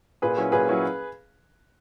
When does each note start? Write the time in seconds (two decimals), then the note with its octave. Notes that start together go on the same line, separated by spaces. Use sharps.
0.22 A#2 G#4 B4
0.37 F#3 C#4 E4
0.52 A#2 G#4 B4
0.67 F#3 C#4 E4